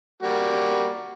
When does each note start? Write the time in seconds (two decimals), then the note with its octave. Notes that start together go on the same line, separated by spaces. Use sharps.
0.23 G3 A#3 F#4